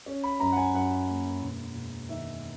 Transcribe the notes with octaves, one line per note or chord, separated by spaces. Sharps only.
C#4
B5
F#2 A#5
F#5
G#5
F#2 F#5
A#3
E1
E1
D#3 E5